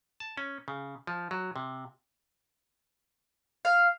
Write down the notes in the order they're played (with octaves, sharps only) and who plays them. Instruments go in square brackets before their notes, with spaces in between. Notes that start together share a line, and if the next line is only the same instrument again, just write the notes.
[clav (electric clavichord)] A5
C#4
C#3
F3
F#3
C3
[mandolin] F5